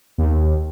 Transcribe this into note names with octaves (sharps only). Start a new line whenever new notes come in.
D#2